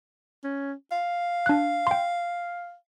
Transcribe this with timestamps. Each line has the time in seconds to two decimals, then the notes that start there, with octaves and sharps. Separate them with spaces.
0.44 C#4
0.92 F5
1.46 D4 F#6
1.87 G5 C6